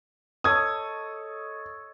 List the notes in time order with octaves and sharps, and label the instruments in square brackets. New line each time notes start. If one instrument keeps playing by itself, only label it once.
[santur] A4 C#5 D#5 [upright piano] D#6 G#6